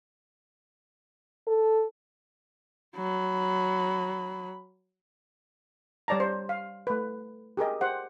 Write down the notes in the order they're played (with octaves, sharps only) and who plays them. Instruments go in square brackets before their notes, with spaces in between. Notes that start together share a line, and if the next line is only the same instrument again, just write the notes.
[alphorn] A4
[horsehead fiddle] F#3 B5
[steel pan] G3 C#5 D5 A5 A#5
C5
F5
A3 B4
G4 G#4 A#4 D#5
G4 C5 F#5